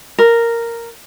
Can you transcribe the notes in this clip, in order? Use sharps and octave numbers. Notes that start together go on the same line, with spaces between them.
A#4